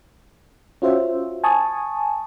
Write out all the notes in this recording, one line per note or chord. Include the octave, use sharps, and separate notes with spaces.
C#4 F4 F#4 C5 E5
G#5 A5 C#6 D#6